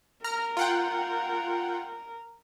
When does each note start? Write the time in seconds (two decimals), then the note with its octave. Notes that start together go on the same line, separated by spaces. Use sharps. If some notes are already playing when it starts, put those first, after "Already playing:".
0.24 A#4 A#5 F6
0.57 F4 F#5 G5